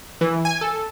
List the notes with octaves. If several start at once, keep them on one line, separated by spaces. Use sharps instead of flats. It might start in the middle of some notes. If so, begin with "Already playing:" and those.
E3
G#5
A4